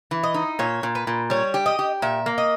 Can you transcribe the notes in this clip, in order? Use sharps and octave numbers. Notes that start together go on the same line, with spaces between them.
E3
D#5
D#4
A#2 C#5
A#2
B4
A#2
G3 C#5
G4
D#5
G4
A#2 E5
A#3
D#5